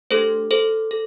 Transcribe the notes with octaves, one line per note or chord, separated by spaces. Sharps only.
A3 D4 G4 A4 C5
A4 C5
A4